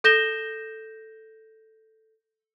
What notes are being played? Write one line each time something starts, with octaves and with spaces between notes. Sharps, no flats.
A4 G6 A#6 E7 G7